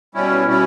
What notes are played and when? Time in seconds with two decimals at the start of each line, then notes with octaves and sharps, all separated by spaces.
0.14 B2 G3 C#4 E4
0.45 B2 G3 C#4 E4